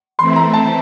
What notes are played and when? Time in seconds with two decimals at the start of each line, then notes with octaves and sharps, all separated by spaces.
0.18 E3 A3 C4 E4 C6
0.36 A#5
0.53 A5